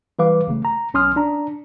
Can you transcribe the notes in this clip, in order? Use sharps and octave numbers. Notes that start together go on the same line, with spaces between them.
E3 G3 B4 F5 D6
A1 C#3 A3
A#5
B1 C#4 C6 D#6 F6
D4 A#5